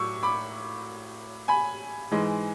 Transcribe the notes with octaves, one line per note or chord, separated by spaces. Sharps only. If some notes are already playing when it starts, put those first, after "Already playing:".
Already playing: A2 F#3 C#6 D6 E6
B5 D6
G#5 B5
G#2 E3 G#3